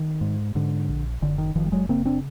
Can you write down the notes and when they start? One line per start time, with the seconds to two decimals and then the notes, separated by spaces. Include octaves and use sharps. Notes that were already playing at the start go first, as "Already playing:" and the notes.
Already playing: D#3
0.21 G#2
0.55 G#2 D3
0.89 A#1
1.22 F#1 D3
1.38 D#3
1.55 F#1 D#3 F3
1.66 G3
1.72 F#3 G#3
1.89 C#3 A#3 C4
2.05 C4 D4